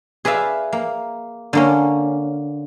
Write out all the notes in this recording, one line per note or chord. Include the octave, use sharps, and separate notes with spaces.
G#4 B4 D5 E5 F5
A#3
D3 A#3 C#4